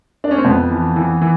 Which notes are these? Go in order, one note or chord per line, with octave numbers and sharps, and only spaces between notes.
D4
C#4
C4
F2 B3
E3
E3
E3